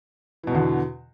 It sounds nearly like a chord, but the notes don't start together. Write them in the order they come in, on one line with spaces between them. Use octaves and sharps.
E3 B2 E2 D3